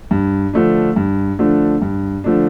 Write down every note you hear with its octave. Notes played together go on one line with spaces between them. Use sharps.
G2
D3 F3 A3 D4
G2
D3 F3 A3 D4
G2
D3 F3 A3 D4